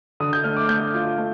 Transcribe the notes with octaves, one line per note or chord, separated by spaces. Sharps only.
D3 D#6
G6
A3 F6
D6
A3 G6
F4
A3